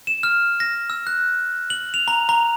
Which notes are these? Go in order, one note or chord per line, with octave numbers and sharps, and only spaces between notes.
E7
F6
A#6
E6
F#6
F#7
F7
A#5
A#5